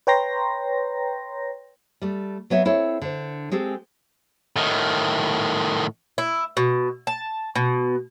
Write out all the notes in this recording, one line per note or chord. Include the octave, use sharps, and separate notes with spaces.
B4 C#5 G5 A#5 C6 A#6
G3 A3
F#3 B3 C#5 E5
C4 E4 A4 C#5
D3 C5
G#3 C4 G4 A4
A2 D#3
E4
B2
A5
B2